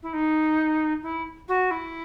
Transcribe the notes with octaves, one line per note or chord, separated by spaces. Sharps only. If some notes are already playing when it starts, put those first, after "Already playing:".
E4
D#4
E4
F#4
E4